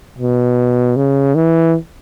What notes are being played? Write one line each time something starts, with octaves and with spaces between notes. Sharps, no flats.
B2
C#3
E3